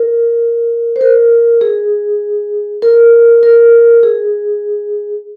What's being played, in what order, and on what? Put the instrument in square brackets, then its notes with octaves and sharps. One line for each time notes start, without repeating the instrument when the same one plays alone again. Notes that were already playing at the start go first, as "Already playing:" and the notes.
Already playing: [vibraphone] A#4
C5
A#4
G#4
A#4
A#4
G#4